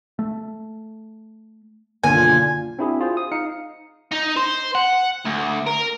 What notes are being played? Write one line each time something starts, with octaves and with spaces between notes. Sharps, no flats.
A3
B1 F#2 D3 D#3 A#3 F4 G#5
C4 D4 E4 F#4 G#4
F4 G#4 C5
D#6
D#4 F5 C#7
D#4
C5
F#5
D2
A#4